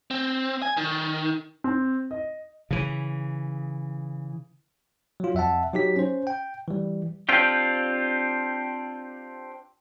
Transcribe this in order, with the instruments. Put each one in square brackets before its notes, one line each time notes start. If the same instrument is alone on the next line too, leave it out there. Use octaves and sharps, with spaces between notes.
[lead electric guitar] C4
G#5
D#3
[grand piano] C4
D#5
[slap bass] C#3 E3
[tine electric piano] F#3 F4
F2 E5 F#5 A5
F#3 D#4 G4 B6
C#4 C5
G5
E3 G3
[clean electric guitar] C4 D4 F4 G4